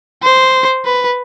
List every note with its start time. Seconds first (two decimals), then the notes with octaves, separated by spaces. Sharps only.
0.23 C5
0.85 B4